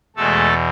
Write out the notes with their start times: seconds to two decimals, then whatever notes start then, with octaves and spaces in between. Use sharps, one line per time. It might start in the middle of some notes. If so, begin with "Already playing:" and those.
0.16 E2 B2 G#3 A3 A4